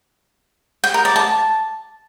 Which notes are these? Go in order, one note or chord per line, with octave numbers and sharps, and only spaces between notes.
G5
A#4
D5
A5